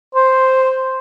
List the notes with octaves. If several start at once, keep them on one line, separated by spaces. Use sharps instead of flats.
C5